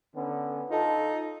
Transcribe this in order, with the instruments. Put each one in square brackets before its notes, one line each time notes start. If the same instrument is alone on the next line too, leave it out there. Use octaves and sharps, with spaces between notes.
[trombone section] D3 B3 C#4
[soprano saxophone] D#4 [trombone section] F4 A4